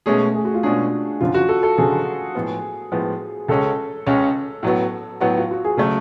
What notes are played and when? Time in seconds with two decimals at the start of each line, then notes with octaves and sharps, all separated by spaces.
0.06 B2 G#3 A3 C#4 G#4
0.35 G#4
0.45 F#4
0.54 F4
0.63 B2 G#3 C#4 D4 G#4
1.21 F#1 F#2 D3 F3 F4
1.34 F#4
1.49 A4
1.63 A4
1.78 F#1 F#2 D3 F3 G#4
2.35 A2 F3 G#3 B3
2.92 A2 F3 G#3 B3
3.48 C#2 C#3 G#3 C#4 A4
4.07 C#2 C#3 G#3 C#4
4.63 A2 F#3 B3 F#4
5.20 A2 F#3 B3 F#4
5.37 F4
5.51 F#4
5.64 G#4
5.77 C#3 F#3 A3 A4